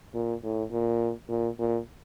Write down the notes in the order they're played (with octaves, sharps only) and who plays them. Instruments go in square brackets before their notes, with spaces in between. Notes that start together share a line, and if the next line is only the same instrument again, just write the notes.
[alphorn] A#2
A2
A#2
A#2
A#2